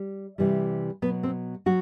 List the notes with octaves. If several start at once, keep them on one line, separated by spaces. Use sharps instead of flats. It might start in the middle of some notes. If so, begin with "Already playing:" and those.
Already playing: G3
C3 E3 G3
B2 F#3 B3
C4
F#3 F#4